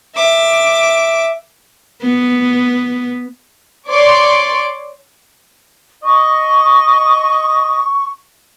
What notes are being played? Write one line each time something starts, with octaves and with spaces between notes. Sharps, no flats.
E5 D6
B3
C#5 D5 C6 D6
D#5 C#6